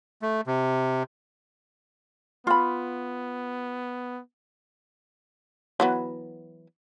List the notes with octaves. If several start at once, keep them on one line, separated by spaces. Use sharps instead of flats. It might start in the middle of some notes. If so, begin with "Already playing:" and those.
A3
C3
B3 F4 B5
E3 F#3 B3